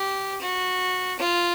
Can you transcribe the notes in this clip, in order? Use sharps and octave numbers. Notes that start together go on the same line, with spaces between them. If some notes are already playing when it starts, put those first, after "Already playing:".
Already playing: G4
F#4
F4